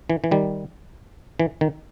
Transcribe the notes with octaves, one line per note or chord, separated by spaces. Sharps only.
E3
E3
D#3 G3
E3
D#3